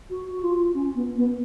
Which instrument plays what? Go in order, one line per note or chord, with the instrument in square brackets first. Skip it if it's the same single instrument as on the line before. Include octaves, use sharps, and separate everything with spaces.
[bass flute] F#4
F#4
F4
C#4
B3
B3